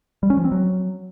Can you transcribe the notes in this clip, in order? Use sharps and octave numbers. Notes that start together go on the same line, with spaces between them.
G3
C#4
F3
C4
F#3